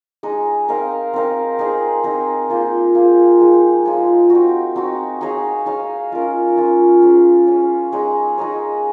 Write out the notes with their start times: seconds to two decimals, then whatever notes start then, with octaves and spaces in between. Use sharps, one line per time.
0.23 G#3 D#4 G#4
0.68 C4 D#4 A#4 F5
1.13 C4 D#4 A#4 F5
1.59 C4 D#4 G#4
2.04 C4 D#4 G#4
2.50 A#3 F4 G#4 C5
2.95 A#3 F4 G#4 C5
3.40 F3 G#3 D#4 G#4
3.85 F3 G#3 D#4 G#4
4.30 C4 D#4 F#4
4.76 C4 D#4 F#4
5.21 D#4 G#4 C#5 F5
5.66 D#4 G#4 C#5 F5
6.12 C#4 F4 A#4
6.57 C#4 F4 A#4
7.02 C#4 G#4 C#5
7.47 C#4 G#4 C#5
7.92 G#3 D#4 G#4 C#5
8.38 G#3 D#4 G#4 C#5